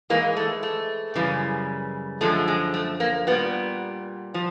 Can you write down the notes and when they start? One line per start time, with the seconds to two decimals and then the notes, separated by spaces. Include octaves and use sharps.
0.10 G#2 E3 G#3 A#3
0.37 A3
0.63 A3
1.15 F#2 C#3 E3 G3
2.21 F#2 D3 F3 G#3 A3
2.48 G#3
2.74 A3
3.00 A#3
3.27 A#2 G3 B3
4.34 F3